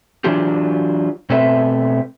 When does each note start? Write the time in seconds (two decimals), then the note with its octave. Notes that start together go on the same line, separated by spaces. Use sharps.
0.24 E3 F#3 D4 F4 G4
1.30 B2 A3 C4 B4 E5